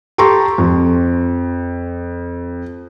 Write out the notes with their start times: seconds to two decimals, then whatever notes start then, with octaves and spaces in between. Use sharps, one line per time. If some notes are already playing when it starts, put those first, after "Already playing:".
0.18 G4 A4 A#5 C6 C#6
0.58 F2